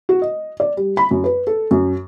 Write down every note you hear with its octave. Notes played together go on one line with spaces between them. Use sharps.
F#4
D#5
D5
G3
B5
F#2
B4
A4
F#2